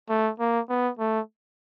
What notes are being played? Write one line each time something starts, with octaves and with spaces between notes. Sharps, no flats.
A3
A#3
B3
A3